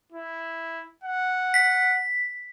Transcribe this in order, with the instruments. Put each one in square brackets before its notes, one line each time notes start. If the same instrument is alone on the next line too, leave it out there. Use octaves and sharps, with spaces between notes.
[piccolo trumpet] E4
F#5
[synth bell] B6